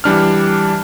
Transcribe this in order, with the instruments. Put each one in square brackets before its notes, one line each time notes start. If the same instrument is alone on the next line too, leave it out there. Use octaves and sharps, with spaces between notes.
[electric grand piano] E3 G3 D4 F6